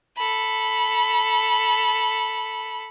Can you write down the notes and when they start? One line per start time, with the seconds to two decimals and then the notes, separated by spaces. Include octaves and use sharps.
0.17 A4 B5